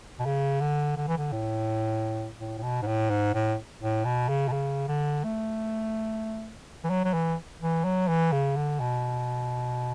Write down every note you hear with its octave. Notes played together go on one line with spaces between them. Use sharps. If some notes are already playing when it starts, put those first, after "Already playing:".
B2
C#3
D3
D3
E3
D3
A2
A2
A2
B2
G#2
A2
G#2
A2
A2
B2
C#3
B2
C#3
D3
A3
E3
F#3
F#3
E3
E3
F#3
E3
C#3
D3
B2